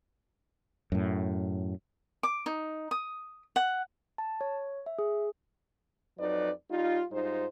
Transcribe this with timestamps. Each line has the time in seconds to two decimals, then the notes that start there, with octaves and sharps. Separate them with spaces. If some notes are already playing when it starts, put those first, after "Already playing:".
0.92 F#2 A2
2.23 D6
2.46 D#4
2.91 D#6
3.56 F#5
4.18 A5
4.41 C#5
4.86 E5
4.99 G#4
6.18 F2 F#3 D#4 B4 D5
6.71 G3 D#4 F4
7.11 G#2 G3 D#4 F4 C5